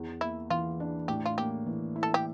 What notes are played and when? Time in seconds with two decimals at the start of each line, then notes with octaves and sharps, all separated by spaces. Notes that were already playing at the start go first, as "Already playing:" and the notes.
Already playing: E2
0.21 A#3 E4
0.50 E3 F4
0.80 D4
1.08 A2 G4
1.26 F4
1.38 A#3 G4
1.66 E3
1.96 E4
2.03 A4
2.14 G4